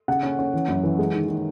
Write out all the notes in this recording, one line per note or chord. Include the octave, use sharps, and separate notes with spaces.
C#3 F#5
C#4
C#4
E3
F#2
E3
G#3
D#3
D#3